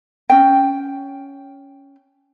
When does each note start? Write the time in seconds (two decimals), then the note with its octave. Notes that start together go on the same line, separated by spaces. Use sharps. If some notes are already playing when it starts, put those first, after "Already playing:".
0.30 C#4 G5